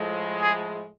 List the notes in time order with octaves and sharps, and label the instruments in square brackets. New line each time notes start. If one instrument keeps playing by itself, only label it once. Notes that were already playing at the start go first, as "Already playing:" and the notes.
Already playing: [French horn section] A2 F3 G#3
[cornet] G#4